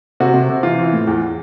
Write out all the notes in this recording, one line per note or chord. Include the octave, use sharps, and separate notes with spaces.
C3 F#4
C3
C3
E3 F4
E3
A2
E2